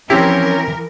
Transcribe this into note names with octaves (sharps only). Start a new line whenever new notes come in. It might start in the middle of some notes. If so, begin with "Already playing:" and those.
E3 F3 C4 C#4 E4 G4 A#4